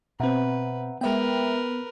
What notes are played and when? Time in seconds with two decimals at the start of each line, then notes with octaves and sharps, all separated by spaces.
0.20 B2 C4 B4 E5 F#5 A#5
1.01 G#3 B3 A#4 B4 E5 G5